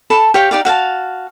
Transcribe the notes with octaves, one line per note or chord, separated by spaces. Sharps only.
A4 A5 B5
G4 C#5 F5 G5
D#4 G4 D5 F5
F#4 F5 G5 A5